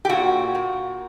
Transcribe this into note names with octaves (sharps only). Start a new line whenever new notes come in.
G4
A#2 F#4
A#2